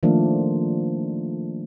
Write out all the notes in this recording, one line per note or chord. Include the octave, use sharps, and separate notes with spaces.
D#3 F3 A3 A#3 D4